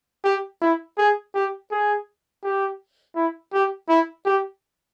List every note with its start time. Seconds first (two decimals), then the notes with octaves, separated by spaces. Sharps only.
0.25 G4
0.62 E4
0.98 G#4
1.34 G4
1.71 G#4
2.44 G4
3.16 E4
3.53 G4
3.89 E4
4.26 G4